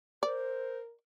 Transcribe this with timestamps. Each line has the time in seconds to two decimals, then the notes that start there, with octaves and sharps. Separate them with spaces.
0.23 A#4 C5 D5